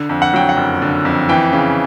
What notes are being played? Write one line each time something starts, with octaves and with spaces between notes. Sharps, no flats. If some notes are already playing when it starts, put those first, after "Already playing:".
Already playing: D3
F2
F#5
F#3 G5
F#5
F#1
D3
F2
E3 G5
C#3